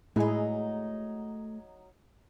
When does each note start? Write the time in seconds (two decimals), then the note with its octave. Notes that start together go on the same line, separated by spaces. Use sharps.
0.16 A2 F#3 G#3 A3 D#4 E4 G#4